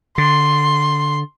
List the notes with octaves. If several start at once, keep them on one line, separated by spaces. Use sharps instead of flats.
D3 C6